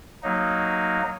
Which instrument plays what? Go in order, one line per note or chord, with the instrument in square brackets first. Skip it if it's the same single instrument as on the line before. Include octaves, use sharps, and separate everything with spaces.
[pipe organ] F#3 A#3 D#4